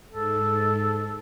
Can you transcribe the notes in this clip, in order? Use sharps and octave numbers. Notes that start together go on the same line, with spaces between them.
G#2 A4